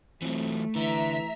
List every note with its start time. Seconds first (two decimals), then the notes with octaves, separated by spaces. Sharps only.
0.22 E3 F#3 A3 C4
0.75 D3 E3 E5 A#5 B6